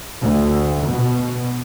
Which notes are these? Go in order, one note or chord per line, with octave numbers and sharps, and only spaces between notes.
D2
B2